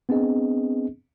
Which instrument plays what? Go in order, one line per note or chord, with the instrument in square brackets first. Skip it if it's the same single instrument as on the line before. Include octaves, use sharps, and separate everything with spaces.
[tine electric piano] B3 C4 D4 G#4 D#5